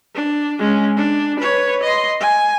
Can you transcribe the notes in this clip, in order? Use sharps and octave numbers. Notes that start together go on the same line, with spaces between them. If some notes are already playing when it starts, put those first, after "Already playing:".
D4
G#3 C#4
D4
B4 C#5
D#5 C6
G#5